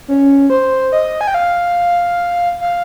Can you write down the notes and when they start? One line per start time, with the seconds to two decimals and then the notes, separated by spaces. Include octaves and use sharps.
0.08 C#4
0.50 C5
0.92 D#5
1.21 G#5
1.27 G5
1.34 F5
2.61 F5